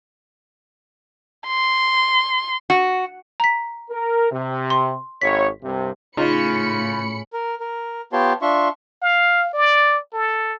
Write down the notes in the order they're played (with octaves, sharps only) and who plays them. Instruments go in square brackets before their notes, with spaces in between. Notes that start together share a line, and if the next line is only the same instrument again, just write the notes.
[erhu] C6
[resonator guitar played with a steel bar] F#4
[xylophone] A#5 B6
[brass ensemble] A#4
C3
[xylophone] C6
[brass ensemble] G#1 C#5 [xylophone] B6
[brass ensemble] C2 G2 C3
[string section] A2 B5 C#7 [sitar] C#3 [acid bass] D#4 [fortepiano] F4
[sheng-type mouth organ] A#4
A#4
B3 F4 G4 C#5 A5 C6
D4 F4 E5 C6 C#6
[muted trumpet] F5
D5
A4